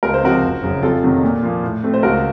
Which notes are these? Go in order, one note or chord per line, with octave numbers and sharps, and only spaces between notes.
C#2 A#4
C5
C3 F3 C4 F#4 A#4
F#1
F#2 C#3 F#3
F2 F4 A4
C3 D#3 F#3
A#2
F3 A#3
A2
A3 C4
C5
C#2 F#4 A#4